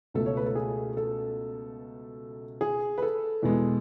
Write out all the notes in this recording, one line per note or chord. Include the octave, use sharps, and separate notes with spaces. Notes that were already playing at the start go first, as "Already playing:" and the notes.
C#2 B2 A3 A4
C#5
B4
A4
G#4
A4
G#4
B4
A4
E2 B2 G#3 B3